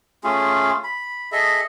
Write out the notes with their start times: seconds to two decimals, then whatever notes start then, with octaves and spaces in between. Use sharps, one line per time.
0.24 A3 C#4 F4 G#4
0.84 B5
1.32 G#4 A4 D#5 E5